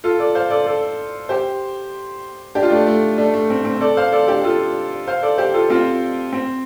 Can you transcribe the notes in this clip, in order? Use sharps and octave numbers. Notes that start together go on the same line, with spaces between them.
F4 A4
A4 D5
C5 F5
A4 D5
A4 D5
G4 C5
D4 G4
F4
A3 D4
A3
A3 D4
A3
C4
C4
A4 D5
C5 F5
A4 D5
D4 G4
F4 A4
C5 F5
A4 D5
G4 C5
F4 A4
C4 F4
C4